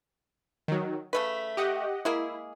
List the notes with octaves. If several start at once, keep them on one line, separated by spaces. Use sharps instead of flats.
D#3 F#3
C#3 A3 B4 B6
G4 D#5 F#5
G#3 A#3 E4 G#4